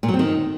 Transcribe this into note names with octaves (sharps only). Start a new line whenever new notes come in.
A#2
F#3
C4
D#3